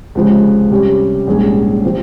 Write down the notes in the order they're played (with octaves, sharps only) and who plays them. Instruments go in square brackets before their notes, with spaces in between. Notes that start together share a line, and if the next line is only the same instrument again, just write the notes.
[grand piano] C#2 C3 F3 G#3 C#4
C3 G3 C#4 G4
A#1 G#2 G3 C#4 G#4
C3 F3 C4